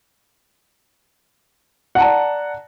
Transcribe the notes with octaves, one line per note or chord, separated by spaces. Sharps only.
D5 F#5 A5 A#5